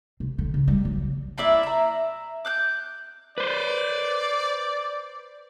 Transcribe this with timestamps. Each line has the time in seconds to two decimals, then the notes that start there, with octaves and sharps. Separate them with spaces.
0.20 C3
0.38 D3
0.54 C#3
0.68 G3
0.85 F#3
0.97 C#3
1.38 A#3 E4 D5 E5
1.63 E5 A#5
2.45 D6 F#6 G6
3.38 B4 C5 D5